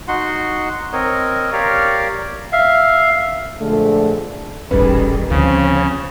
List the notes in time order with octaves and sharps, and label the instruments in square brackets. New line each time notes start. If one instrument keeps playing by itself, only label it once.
[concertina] D#4 F#4 F#5 C6
C4 A#4 C#5 D#5
G4 A#4 C#5 D5 F5
E5 F5
[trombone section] A#1 D3 G#3 A3
[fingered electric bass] D#1 A1 [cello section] D#3 G3 G#4 [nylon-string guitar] C#4 A4 B4
[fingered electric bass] D2 [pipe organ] C#3 [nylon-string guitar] F3 [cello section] C4 C#4